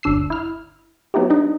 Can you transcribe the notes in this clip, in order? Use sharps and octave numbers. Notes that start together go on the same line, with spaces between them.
G1 D2 D4 E6 C7
E4 F6
F#3 B3 D#4 E4 G4
D4 D#4